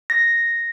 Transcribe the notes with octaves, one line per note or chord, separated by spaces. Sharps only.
A#6